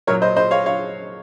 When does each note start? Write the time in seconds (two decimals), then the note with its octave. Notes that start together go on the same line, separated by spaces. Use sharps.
0.07 A#2 F#3 A#4 C#5
0.22 C5 D#5
0.36 C5 D#5
0.51 C#5 F5
0.66 C#5 F5